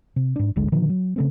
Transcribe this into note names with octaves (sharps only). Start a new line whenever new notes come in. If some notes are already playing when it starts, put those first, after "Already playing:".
C3
G#2 D4
D1 G#1 D3 G#3
A#2 D3 D#3 F3
F#3
C#3 A3 C4